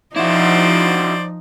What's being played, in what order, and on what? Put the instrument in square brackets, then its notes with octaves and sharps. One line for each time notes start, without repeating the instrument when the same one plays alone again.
[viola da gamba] F3 D#4 [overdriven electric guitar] E4 F#4 [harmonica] C5 D5